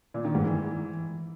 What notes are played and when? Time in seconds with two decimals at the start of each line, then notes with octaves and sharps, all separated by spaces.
0.14 A#2
0.25 D#3
0.35 G#2
0.45 E3